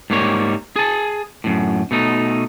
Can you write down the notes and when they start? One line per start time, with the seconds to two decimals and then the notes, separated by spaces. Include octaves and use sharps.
0.10 G#2 G3 A#3 C#5
0.76 G#4 A5
1.44 F#2 A2
1.91 B2 A3 D#4